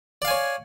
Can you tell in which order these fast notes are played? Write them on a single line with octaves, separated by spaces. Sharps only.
D5 F5 G#5 C#5